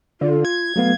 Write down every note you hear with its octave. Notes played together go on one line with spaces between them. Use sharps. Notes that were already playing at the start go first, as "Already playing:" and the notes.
D3 F4
G#6
F#3 A3 B3 F5